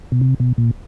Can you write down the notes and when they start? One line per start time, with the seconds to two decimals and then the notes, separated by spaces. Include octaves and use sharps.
0.12 B2
0.21 C3
0.40 B2
0.58 A#2